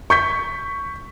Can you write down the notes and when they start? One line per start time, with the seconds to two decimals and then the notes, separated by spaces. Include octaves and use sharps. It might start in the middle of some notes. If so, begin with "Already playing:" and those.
0.10 C#6 G6 B6